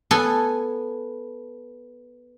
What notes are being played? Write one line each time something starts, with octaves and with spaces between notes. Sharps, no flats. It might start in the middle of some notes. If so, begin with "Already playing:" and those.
B3 A4 G#5